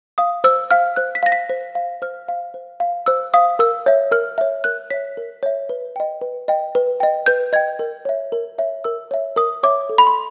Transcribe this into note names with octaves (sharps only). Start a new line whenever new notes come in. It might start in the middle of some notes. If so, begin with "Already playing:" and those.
F5 D#6
C5 E6
F5 F6
C5 F#6
B6
F5 A#6
B6
C5
F5
C5 F6
F5
C5
F5
C5 E6
F5 D#6
A#4 E6
C#5 E5
A#4 F6
C#5 E5
A#4 F#6
C#5 E5 B6
A#4
C#5 E5
B4
D#5 G5
B4
D#5 G5
B4
D#5 G5
B4 G6
D#5 G5 G#6
A#4
C#5 E5
A#4
C#5 E5
A#4 E6
C#5 E5
A#4 D#6
C#5 E5 D6
A4
B5
C6